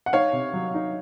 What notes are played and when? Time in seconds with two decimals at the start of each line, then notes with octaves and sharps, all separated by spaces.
0.06 F#5
0.13 D#4 C#5 F5
0.33 C3
0.53 F#3
0.74 D#4